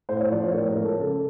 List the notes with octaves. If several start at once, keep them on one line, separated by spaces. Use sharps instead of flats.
A2 C5
C#5
F3 A3 D5
C#5
A2 A#4
A#4
F3 G#3
A4
C#3 A4